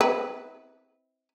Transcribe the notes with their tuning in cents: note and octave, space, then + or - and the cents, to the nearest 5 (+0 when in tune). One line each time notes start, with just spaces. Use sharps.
C4 +0 E4 -35 B4 +0